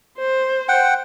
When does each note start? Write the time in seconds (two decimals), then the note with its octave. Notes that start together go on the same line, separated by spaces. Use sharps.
0.18 C5
0.68 F#5 G5